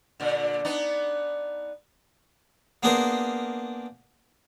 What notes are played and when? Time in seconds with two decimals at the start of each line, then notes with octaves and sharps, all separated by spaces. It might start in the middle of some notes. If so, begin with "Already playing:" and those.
0.20 A#2 D3
0.65 B3 D4 D#4
2.83 A#3 B3 D4 G#4 A#4 C5